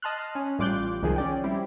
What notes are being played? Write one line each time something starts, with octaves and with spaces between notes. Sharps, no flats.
D#5 A5 C6 F6 F#6
C#4
A1 G3 F4 D6 F#6 G6
C2 D#3 F3 G#4
C#4 D5 G5
G3 C4 E4 G4